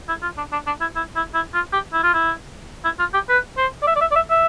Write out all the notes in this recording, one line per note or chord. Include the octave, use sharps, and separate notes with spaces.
E4
F4
D4
D4
D4
E4
E4
E4
E4
F4
G4
E4
F4
E4
E4
F4
G4
B4
C5
D5
E5
D5
E5
D5
E5
E5